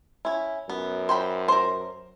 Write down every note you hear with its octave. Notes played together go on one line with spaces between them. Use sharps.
C#4 E4
F#2 B3
C5 G5 B5
A#4 C5